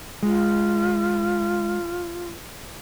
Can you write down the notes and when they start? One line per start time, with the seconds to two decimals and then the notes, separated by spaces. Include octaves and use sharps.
0.23 G#3 F4